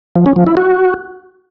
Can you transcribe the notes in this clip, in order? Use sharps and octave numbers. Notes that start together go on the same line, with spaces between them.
F3
C#4
F3
E4
F#4